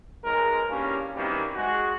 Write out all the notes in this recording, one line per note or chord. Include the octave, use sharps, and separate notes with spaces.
B1 G#3 A#4
C2 G2 G3 A#3 C#4
F#2 D#3 E3 G3 A#3 C4
G#3 F#4 G#4